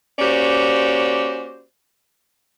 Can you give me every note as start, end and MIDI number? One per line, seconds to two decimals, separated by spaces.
0.19 1.63 58
0.19 1.63 61
0.19 1.63 66
0.19 1.63 67
0.19 1.63 72
0.19 1.63 74